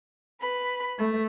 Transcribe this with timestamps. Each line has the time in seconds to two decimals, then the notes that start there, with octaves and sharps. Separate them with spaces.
0.41 B4 B5
0.98 A3